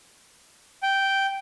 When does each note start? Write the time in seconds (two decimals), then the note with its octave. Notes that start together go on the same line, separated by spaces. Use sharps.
0.83 G5